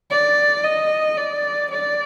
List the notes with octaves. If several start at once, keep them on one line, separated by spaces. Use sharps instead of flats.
D5
D#5
D5
D5